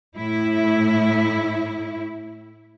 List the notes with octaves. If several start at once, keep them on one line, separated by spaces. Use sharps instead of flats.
A2 E4